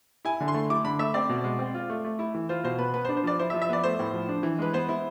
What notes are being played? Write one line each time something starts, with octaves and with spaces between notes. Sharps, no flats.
E4 G#5
D3
C6
A3
E4 D6
D3 B5
A3 E5
C4 D5
B2
G#3
C4
F4
A3
A3
E4
E3
F4 C5
B2 C5
B3 B4
B3 B4
C5
D4
C5
F3 D5
E4 C5
E5
F3
E5
B3 D5
A3 C5
A2
F3
D4
E3
G#3 B4
B3 C5
E4